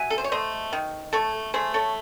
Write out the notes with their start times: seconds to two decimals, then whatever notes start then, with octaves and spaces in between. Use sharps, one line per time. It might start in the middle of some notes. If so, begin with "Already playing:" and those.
Already playing: F#3 E5 G#5
0.10 A4
0.18 C5
0.24 C#5
0.32 A3 C5 D#5
0.73 D#3
1.13 A3 A4 C#5
1.54 A3 G#4 C5
1.74 A4 C#5